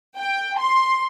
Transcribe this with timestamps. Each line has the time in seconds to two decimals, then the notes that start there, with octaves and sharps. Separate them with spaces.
0.17 G5
0.59 C6